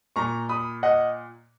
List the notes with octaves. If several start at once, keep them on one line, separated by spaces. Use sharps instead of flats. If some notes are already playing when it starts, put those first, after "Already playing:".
A#2 A#5 C#6
B5 D#6
D#5 F#5